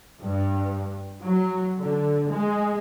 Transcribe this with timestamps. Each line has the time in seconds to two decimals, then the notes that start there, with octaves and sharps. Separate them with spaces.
0.23 G2
1.25 F#3
1.79 D3
2.30 G#3